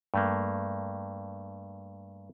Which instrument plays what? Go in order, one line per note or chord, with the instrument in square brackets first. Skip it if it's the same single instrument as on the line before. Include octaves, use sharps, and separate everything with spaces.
[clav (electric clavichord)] G2 A3 A#3